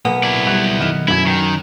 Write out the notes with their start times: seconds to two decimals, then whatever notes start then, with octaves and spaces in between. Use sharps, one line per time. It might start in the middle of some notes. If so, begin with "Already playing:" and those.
0.05 B1 A#3 B3
0.23 E4 D5
0.46 G3 F#6
0.79 D#3 F6 E7
1.08 F#2 E4 G#6
1.26 D#3